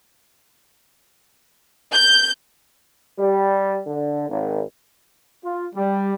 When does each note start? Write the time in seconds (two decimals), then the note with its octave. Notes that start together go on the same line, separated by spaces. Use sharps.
1.93 G6
3.18 G3
3.86 D3
4.28 G#1
5.44 F4
5.75 G3